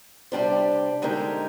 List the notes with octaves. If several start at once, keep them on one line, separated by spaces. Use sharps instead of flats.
C3 G3 D4 G4 C5
D3 G#3 D#4 G4 A#4